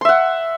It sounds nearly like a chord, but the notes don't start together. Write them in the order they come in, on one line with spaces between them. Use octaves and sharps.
C6 E5 F#5